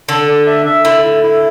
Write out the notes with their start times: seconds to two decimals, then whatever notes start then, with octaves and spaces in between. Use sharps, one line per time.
0.09 D3 A4
0.28 D4
0.47 E5
0.66 E5
0.85 D3 E4
1.05 E4
1.23 E4